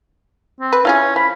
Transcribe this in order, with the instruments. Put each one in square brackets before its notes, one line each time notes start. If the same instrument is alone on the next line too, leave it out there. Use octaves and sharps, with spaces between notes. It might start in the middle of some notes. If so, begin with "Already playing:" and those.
[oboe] C4
[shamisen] B4
[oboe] C#4 [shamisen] E4 F4 G#4
[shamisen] F3 [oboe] B5